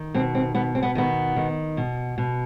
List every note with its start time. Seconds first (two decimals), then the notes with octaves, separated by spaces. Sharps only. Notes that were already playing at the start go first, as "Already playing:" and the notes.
Already playing: D#3
0.14 B2 C4
0.35 C4
0.55 B2 B3
0.75 C4
0.83 B3
0.95 D#3 B3
1.36 D#3
1.77 B2
2.18 B2